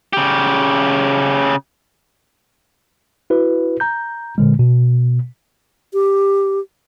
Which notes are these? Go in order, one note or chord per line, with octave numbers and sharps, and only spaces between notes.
C#3 G4
E4 F#4 B4
A#5 G6
A#2 D3 G#3
B2
G4